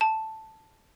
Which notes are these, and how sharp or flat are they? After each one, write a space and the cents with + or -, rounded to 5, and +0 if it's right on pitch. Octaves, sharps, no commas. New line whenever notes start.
A5 +0